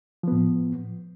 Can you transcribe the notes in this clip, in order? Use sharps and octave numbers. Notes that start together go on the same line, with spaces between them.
A2 F3 B3